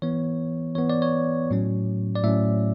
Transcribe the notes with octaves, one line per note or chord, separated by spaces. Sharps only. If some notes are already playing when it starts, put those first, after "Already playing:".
E3 B3 C#5
E3 B3 C#5
D5
C#5
A2 F#3 C#4
D5
A2 F#3 C#4 E5